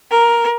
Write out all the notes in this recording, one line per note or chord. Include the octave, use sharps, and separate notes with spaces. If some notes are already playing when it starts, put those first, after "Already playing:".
A#4